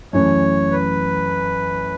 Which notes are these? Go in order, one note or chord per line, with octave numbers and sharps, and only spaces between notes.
F#2 E3 A3 C#4 C#5
B4